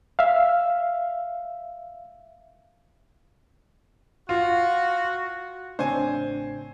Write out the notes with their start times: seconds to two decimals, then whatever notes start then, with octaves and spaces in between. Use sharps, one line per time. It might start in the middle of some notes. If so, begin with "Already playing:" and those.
0.19 E5 F5
4.29 F4 F#4
5.79 A1 C#3 A3 C4 D4 C5 C#5 G#5